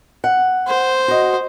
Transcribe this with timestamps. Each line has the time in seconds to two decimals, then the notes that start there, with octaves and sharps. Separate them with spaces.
0.24 F#5
0.68 C5
1.08 F#4 D#5